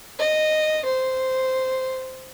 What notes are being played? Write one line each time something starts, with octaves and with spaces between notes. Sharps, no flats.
D#5
C5